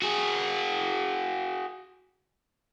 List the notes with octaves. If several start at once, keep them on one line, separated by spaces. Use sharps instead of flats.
F#4 G#4